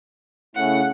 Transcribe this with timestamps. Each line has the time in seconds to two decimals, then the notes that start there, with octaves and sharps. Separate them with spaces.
0.55 C#3 A3 C#4 E4 F#5